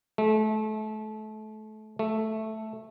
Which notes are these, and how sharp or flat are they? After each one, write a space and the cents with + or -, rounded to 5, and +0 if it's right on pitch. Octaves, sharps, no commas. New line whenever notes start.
A3 -30
A3 -5